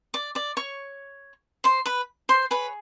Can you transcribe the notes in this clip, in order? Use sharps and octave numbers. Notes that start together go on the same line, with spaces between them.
D5 D6
D5 D6
C#5 C#6
C5 C6
B4 B5
C5 C6
G#4 B4 C#5 B5